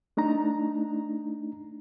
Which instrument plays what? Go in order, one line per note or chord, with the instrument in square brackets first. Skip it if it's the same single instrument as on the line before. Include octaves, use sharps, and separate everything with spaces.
[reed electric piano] A3 D4 D#4 A#5